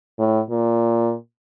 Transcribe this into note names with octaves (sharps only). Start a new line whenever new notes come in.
A2
A#2